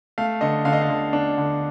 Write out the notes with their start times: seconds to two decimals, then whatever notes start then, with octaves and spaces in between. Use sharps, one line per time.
0.18 A3 F5
0.41 D3 D#5
0.65 D3 F5
0.73 D#5
0.82 F5
0.90 D3
1.13 D4
1.38 D3